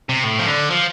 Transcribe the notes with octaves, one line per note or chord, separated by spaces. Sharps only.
C3
A2
F3
D3
F3